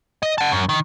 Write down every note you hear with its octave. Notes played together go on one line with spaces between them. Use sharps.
D#5
F#5 A5
F#2
D#3